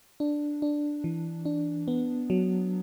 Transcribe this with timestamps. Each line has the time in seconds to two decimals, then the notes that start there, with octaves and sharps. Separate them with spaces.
0.20 D4
0.62 D4
1.04 E3
1.45 D4
1.88 B3
2.30 F#3